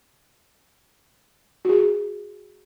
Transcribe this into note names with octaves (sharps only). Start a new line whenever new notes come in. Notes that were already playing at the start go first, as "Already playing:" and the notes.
F#4 G#4